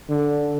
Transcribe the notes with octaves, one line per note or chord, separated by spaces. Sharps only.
D3